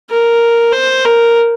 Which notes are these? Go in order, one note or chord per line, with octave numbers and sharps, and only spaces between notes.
A#4
C5
A#4